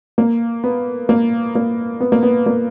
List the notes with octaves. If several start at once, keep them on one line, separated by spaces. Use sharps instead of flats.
A#3
B3
A#3
A#3
B3
A#3
B3
A#3